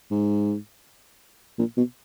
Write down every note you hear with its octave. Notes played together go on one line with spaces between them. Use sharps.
G#2
A#2
B2